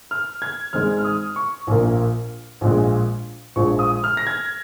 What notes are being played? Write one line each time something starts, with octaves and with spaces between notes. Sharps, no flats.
F6
G#6
G#1 G#2 G#3 F6
F6
D#6
C#6
A#1 A#2 A#3
A#1 A#2 G#3
A#1 A#2 F3 G#3 C#6
D#6
F6
A#6
G#6